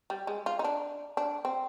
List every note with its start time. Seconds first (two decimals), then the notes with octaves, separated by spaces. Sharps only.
0.10 G3
0.27 G#3
0.46 F4
0.59 D#4
0.64 D4
1.17 D4
1.45 C4